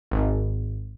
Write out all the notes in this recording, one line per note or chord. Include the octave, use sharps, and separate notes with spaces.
G#1